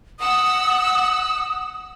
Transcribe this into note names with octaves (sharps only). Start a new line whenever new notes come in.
F#5 D#6 E6